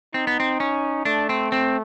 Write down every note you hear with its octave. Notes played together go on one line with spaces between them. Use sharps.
C4 D#4
B3
C4
C#4
A3 D4
C4
C4